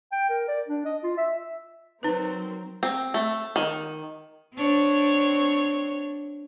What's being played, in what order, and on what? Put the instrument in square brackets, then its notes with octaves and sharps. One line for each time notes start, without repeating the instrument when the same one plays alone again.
[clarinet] G5
A#4
D5
D4
D#5
F4
E5
[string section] F#3 C4 A#4 [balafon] D#4 B4
[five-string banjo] C4
A3
D#3
[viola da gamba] C4 D4 C#5